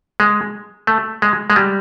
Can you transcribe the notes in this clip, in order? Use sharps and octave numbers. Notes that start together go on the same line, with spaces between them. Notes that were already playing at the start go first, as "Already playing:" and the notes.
G#3
A3
G#3
G#3
G3